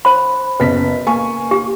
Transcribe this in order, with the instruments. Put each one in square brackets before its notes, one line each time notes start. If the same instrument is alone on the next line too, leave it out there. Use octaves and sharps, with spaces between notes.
[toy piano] C5 B5
[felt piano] F#1 B3 B6 [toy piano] B4
[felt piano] A#3 G#5 C#6
[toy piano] G4